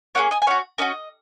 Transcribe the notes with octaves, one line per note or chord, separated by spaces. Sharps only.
A#3 C#4 G#4 C#5 F#5
D#5 G#5
G#5
C#4 F#4 C#5 F#5
C#4 F#4 A#4 D#5